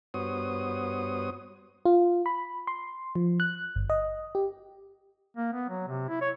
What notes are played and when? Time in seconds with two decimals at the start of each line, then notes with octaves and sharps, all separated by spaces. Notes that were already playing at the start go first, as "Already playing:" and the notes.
0.14 G2 B3 F#4 C5 C#5 D#6
1.85 F4
2.26 B5
2.67 C6
3.15 F3
3.40 F#6
3.76 G1
3.90 D#5
4.35 G4
5.37 A#3
5.53 B3
5.69 F#3
5.88 C3
6.09 E4
6.22 C#5